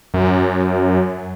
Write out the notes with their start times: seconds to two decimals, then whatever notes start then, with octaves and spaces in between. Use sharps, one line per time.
0.14 F#2